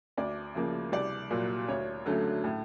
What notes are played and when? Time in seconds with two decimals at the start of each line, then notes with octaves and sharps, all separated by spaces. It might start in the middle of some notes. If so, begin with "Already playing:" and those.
0.17 D2 D5
0.55 C#3 F3 A#3
0.92 C2 D5
1.30 A#2 F#3
1.68 D2 C#5
2.06 D3 F#3 A3 C#4
2.44 A2